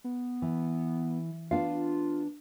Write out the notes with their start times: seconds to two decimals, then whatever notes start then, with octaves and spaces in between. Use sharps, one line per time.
0.04 B3
0.42 E3
1.51 B3 D4 F4 F5